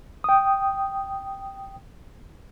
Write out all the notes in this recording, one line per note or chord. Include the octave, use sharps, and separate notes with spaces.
G5 D#6